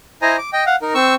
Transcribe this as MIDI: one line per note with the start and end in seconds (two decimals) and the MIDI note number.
0.22 0.37 64
0.22 0.37 72
0.22 0.37 75
0.22 0.37 80
0.22 0.37 82
0.38 0.50 86
0.53 0.64 75
0.53 0.64 79
0.66 0.76 77
0.66 0.76 78
0.82 0.94 63
0.82 0.94 70
0.95 1.15 60
0.95 1.15 85
0.95 1.15 88